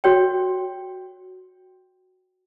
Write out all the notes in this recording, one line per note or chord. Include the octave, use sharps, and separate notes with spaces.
F#4 C#5 G5